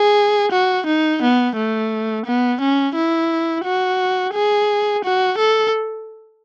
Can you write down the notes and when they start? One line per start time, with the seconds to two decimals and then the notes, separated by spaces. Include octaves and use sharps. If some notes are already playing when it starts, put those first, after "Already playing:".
Already playing: G#4
0.52 F#4
0.86 D#4
1.22 B3
1.57 A3
2.26 B3
2.61 C#4
2.95 E4
3.65 F#4
4.34 G#4
5.04 F#4
5.38 A4